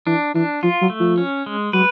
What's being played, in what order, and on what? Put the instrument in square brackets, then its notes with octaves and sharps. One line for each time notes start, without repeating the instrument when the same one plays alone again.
[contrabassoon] E3 [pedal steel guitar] D4
[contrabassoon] E3 [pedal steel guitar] D4
[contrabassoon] F3 [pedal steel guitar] F4
[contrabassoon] F#3
[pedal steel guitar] A3
[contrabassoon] F3
[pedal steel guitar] C#4
G#3
[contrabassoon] F#3 [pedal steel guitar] B4